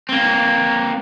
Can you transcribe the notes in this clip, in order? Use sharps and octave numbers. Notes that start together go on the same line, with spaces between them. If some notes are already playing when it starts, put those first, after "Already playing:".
A#3 C4